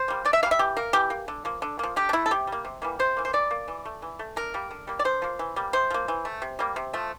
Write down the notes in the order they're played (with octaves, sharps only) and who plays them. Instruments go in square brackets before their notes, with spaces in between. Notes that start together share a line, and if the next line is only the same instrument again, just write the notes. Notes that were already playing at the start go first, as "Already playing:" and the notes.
Already playing: [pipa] C5
G3 A#3
D3 D5
E5
A#3 F5
G3
E5
E3 G4
A#3 A#4
E3 G4
A#3
D3
F3 A#3
D3
F3 A#3
D3 G4
D4
A3 E4
A4
C3 G4
G3 A#3
C3
E3 G3 A#3
C3 C5
E3 A#3
C5
E3 D5
A#3
E3
A3
E3
A3
D3 A#4
G3 A#3
D3
G3 A#3
D5
D3 C5
F3 A#3
E3
G3 A#3
C3 C5
F3 A#3
E3
A3
C3
G3 A#3
C3
F3 A3